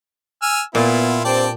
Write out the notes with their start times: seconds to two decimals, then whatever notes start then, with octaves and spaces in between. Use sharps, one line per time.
0.42 G#5 E6 F6
0.75 A#2 B3 E4 F4
1.25 G2 G3 C4 D5 G5 A5